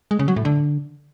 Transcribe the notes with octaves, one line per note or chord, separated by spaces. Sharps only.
G#3
C#3
F#3
A2
D3